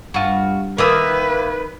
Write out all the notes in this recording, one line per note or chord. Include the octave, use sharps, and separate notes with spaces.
G2 F4 F#4
D#3 A#3 B4 E5 D#6